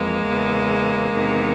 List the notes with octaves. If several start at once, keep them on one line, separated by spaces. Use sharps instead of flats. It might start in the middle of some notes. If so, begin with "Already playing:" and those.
Already playing: F2 E3 G#3 A#3
E2 C#3 E3
E2 C3 D#3